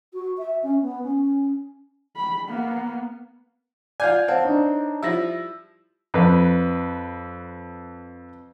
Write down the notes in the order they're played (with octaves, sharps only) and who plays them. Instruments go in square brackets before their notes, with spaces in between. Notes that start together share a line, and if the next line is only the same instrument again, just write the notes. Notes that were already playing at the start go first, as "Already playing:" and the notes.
[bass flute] F#4
E5
C#4
B3
C#4
[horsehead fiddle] B5
A#3 B3
[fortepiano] F4 F5 G#5 [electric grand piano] D5 G6
[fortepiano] C4 [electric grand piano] F5 F#5 A5
[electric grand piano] D4 D#4 C#5
[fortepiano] F3 G3 E4 [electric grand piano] E6 A#6
[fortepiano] F2 B4